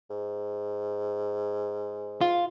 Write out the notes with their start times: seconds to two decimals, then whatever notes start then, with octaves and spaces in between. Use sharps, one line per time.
0.10 G#2
2.21 F4